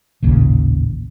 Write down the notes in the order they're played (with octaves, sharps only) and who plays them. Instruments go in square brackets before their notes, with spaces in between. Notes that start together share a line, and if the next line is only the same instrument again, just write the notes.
[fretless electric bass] A1 D#2 A#2 C#3